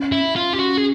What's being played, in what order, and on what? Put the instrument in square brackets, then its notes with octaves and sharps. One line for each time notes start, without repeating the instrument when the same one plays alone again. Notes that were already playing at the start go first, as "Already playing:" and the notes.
Already playing: [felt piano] C#4
[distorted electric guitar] E4
[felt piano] C#4
[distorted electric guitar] F4
[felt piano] C#4 [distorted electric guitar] G4
[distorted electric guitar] F#4
G#4